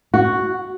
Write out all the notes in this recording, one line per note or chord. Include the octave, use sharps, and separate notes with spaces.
F#4